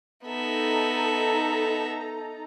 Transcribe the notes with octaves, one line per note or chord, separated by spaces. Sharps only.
B3 D#4 A4 E5 A#5